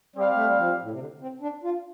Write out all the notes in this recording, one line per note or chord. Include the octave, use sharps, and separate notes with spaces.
G3 C4 G4 F5
A3
G3
F3
A2
C3
D3
C4
D4
F4